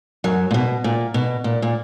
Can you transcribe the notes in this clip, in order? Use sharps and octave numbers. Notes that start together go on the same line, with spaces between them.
F#2 F#3
A#2
B2
A#2
B2
A#2
A#2